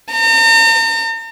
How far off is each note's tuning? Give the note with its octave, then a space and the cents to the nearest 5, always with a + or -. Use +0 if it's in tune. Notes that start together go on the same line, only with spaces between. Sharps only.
A#5 -45